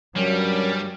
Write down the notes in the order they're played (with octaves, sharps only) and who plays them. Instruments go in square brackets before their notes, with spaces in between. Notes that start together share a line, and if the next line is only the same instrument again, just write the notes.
[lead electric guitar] G2 [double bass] F#3 [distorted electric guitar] G3 [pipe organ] C#4 A#4 C#5